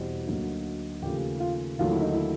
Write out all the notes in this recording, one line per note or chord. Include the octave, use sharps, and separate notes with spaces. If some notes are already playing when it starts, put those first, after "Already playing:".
Already playing: E2 B2 G3 C4
D2 D3 F#3 A#3 D#4
D#2 C#3 F3 A3 G4
F4
D#2 D3 F#3 A3 D4 F4
E4
D#4
E4